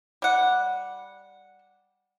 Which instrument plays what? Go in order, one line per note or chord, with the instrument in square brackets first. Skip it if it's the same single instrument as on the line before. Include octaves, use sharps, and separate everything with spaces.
[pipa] G3 F#5